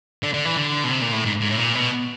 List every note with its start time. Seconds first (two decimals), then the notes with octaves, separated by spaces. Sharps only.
0.23 D3
0.34 D3
0.45 E3
0.57 D3
0.84 B2
0.90 C3
1.02 A#2
1.13 A2
1.25 G#2
1.41 G#2
1.49 A2
1.58 A#2
1.75 B2